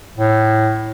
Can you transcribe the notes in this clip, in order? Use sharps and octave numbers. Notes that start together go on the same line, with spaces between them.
A2